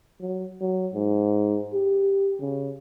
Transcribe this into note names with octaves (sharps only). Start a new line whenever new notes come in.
F#3
F#3
G#2
G4
C#3